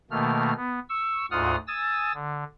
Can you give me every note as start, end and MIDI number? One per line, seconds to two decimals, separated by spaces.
0.11 0.53 47
0.11 0.53 51
0.11 0.53 57
0.11 0.53 58
0.11 0.53 89
0.57 0.79 59
0.89 1.26 85
0.89 1.26 88
1.31 1.56 38
1.31 1.56 44
1.31 1.56 65
1.31 1.56 78
1.31 1.56 87
1.31 1.56 89
1.68 2.13 80
1.68 2.13 87
1.68 2.13 88
1.68 2.13 93
2.14 2.44 50